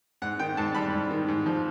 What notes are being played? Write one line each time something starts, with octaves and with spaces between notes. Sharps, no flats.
G#2 F#5
D#3 G5
G#2 A5
G3 B5
G#2
D#3
G#2
F3